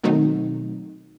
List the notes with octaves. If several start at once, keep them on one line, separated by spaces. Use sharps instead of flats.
B2 D#3 F#3 A3 C4 D#4